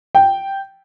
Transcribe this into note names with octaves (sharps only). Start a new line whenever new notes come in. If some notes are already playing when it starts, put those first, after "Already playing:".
G5